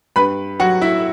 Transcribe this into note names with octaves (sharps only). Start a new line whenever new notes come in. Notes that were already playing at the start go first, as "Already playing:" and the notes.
G2 B4 B5
F#3 F#4 F#5
E4 E5